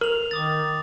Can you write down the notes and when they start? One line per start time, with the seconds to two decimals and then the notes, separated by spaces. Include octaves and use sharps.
0.01 A#4 F7 F#7
0.31 D#3 D6 D#6 A6